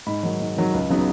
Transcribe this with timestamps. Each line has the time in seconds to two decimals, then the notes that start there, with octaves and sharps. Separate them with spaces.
0.06 G#2 B5
0.23 D#3 F#3
0.40 G#2
0.57 D#3 F#3
0.73 C#2
0.90 C#3 F#3 B3 D#4